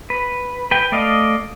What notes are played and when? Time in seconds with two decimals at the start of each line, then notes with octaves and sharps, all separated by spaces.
0.10 B4
0.71 B4 G5
0.92 A3 D5 D#5 F5